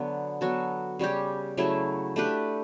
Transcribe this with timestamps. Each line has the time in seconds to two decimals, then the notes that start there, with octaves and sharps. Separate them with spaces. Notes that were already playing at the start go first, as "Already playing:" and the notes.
Already playing: D3 F#3 B3
0.41 F#3 B3 F#4 A4
0.99 C#3 G3 C#4 G4
1.57 C#3 F#3 A3 E4
2.16 A3 D4 G4 B4